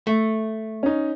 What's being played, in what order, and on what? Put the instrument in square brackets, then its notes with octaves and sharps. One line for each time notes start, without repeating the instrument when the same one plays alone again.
[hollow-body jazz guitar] A3
[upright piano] C#4 D#4